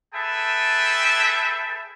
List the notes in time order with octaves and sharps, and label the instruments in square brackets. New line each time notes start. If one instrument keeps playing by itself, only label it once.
[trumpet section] G#4 A4 B4 E5 G5 A5